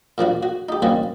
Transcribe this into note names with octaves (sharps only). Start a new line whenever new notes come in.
A#2 F3 D4 F#4
F#4
D#4 G4
G3 A#3 C4 C#4 D#4 F#4